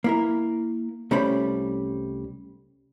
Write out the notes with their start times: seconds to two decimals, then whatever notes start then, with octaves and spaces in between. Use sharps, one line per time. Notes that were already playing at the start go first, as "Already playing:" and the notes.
0.04 A#3 E4 A#4
1.11 C2 G3 A3 C#4 C5 B5